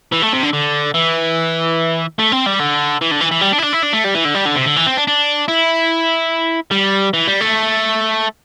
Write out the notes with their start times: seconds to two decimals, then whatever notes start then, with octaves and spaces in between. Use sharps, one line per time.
0.12 E3
0.22 A3
0.33 C3
0.43 D3
0.53 D3
0.94 E3
2.19 A3
2.32 C4
2.46 G3
2.60 D3
3.01 E3
3.11 D3
3.21 E3
3.32 E3
3.42 G3
3.53 D4
3.59 E4
3.63 D4
3.74 E4
3.83 D4
3.93 A3
4.05 G3
4.15 E3
4.25 D3
4.35 G3
4.46 D3
4.56 C3
4.66 D3
4.76 E3
4.86 C4
4.97 D4
5.07 D4
5.48 E4
6.71 G3
7.13 E3
7.27 G3
7.41 A3